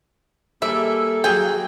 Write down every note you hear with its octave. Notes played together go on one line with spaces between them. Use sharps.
G3 A#3 G#4 A4 E5
F#3 A#3 F#4 G#4 G5